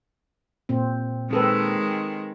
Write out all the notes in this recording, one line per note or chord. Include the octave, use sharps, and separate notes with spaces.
A#2 C4
D#3 G#3 C4 A4 B4